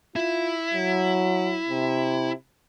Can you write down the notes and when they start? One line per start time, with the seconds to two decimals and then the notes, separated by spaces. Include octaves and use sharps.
0.16 E4 F4
0.74 F#3
1.69 C3